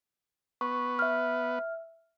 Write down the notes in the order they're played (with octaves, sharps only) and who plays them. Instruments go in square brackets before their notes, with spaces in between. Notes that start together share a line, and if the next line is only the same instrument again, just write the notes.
[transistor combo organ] B3 B4 [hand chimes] C#6
[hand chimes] E5 F6